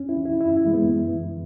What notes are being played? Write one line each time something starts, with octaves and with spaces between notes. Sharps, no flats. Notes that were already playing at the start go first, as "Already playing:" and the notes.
Already playing: E2 C#4
E4
E3
E4
F#2 E4
E4
E3 G#3
B3
F#2
E3